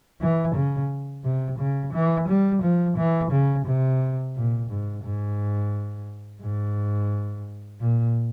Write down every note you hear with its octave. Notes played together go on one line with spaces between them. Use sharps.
E3
C#3
C3
C#3
E3
G3
F3
E3
C#3
C3
A#2
G#2
G#2
G#2
A#2